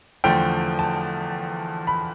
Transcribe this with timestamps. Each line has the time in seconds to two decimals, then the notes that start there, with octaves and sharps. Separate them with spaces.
0.24 E2 D3 F3 A3 G5
0.79 A5
1.87 B5